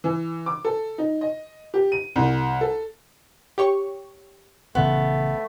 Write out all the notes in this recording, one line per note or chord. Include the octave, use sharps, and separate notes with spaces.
E3
D6
A4
D#4
D#5
G4
D#7
C2
A4
G4 C#5 C#6
A#1 C#3 E3 A3 B3